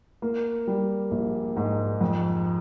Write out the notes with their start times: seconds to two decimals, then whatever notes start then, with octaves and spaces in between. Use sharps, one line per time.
0.22 A#3
0.67 G3
1.11 A#1
1.56 G#2
2.01 F2